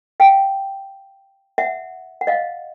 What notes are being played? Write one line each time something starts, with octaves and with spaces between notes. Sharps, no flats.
F5 G5
E5 F#5
F#5
D#5 F5